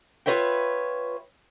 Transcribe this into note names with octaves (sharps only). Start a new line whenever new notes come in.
F4 B4 C#5 E5 G5